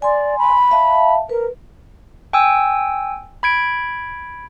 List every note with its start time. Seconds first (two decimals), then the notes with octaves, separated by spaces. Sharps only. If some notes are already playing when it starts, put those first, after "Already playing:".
0.02 D5 G#5 C6
0.38 B5
0.71 E5 F5 A5
1.29 A#4 B4
2.33 G5 G#5 E6
3.43 B5 G#6 D7